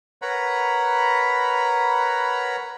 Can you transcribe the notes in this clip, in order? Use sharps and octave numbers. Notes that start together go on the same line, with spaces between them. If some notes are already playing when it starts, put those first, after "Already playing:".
A#4 B4 C#5 F#5 A#5 B5